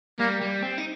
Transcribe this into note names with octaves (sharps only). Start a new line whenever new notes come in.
G3 A#3
G3
C4
D#4